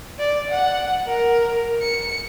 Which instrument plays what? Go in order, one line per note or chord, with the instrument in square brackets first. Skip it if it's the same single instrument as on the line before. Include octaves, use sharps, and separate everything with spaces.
[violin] D5
F#5
A#4
C#7